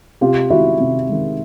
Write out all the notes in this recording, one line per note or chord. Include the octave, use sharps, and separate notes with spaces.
C3 F4 G4
D#3 G#3 E4 F#4
C3
D#3 G#3